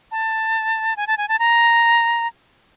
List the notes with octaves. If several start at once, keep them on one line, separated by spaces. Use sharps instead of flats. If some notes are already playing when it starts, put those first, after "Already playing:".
A5
G#5
A5
G#5
A5
A#5